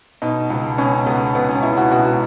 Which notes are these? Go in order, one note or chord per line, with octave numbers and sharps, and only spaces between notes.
B2 D#4
C#2
B2 C#4
C#2 B3
B2 B3
C#4
C#2 E4
F#4
B2 F#4